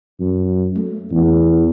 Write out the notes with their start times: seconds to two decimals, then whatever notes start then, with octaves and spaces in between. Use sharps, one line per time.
0.20 F#2
0.77 A3
1.11 E2